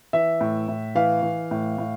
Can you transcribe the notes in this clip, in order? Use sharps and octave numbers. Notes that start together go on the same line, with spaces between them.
E3 E5
A2
A2
E3 F5
E3
A2
A2